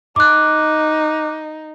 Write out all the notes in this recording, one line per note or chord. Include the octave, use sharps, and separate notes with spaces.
D#4 D6 F#6